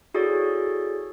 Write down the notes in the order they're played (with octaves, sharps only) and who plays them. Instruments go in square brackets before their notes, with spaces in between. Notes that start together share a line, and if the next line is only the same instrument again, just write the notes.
[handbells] E4 F#4 G#4 A4 C#5 D5